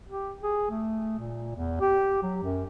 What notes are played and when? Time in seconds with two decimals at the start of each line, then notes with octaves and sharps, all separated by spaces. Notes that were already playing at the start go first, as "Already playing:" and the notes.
0.08 G4
0.43 G#4
0.70 A3
1.19 A#2
1.56 E2
1.81 G4
2.23 F#3
2.43 F#2